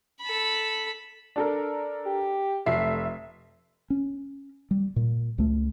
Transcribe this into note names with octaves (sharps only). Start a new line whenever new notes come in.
A4 B5
D4 A4 A#4
G4
F1 A3 E5 C7
C#4
G3
A#2
C#2 A3